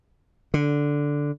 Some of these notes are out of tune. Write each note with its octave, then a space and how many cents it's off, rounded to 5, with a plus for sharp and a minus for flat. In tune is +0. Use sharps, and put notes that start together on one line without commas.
D3 -5